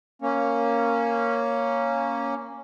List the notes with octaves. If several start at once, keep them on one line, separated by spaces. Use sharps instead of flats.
A#3 C#4